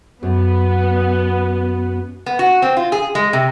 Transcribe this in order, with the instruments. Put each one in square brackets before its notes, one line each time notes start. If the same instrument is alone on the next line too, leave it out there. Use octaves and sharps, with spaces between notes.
[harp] F#2 [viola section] B3
[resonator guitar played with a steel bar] B3
F#4
C4
F4
G#4
G#3
C3